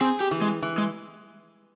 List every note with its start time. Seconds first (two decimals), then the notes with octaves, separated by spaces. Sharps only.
0.01 C4 G#4
0.20 G4
0.31 E3
0.42 G#3
0.62 E3
0.78 G#3